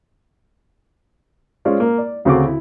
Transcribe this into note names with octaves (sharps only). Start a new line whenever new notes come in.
G#3 C#4 F4 C5 D5
A#3
D5
D2 C#3 C4 F#4 A4 D6
E4